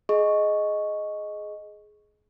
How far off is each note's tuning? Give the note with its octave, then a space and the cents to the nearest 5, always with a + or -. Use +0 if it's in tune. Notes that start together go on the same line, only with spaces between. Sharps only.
G#4 +20 D#5 +0 C#6 +0